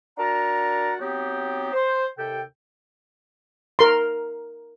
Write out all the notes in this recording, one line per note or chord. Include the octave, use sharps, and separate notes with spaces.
D4 F#4 A#4 F#5 A5 A#5
F#3 B3 C4 D#4 G4
C5
D#2 C3 A4 G5
A#4 C6